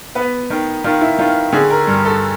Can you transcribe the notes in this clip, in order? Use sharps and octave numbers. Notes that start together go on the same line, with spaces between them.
B3 B4
D#3
D#3 F4
E4
D#3 F4
D3 G#4
A#4
G2
A4